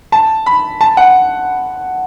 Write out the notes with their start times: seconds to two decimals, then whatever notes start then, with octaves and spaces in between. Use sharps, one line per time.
0.12 A5
0.46 B5
0.81 A5
0.97 F#5